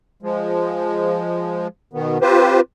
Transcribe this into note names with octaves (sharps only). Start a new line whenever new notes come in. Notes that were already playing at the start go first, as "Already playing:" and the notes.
F3 G#3
B2 D#3 B3
C4 F4 G4 B4 C5